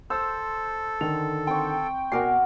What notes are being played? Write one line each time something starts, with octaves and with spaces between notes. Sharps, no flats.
A4 C5 E6
D3 D#3 F7
C4 G5 C#6
B2 F#4 A#4 D5 G#5 C7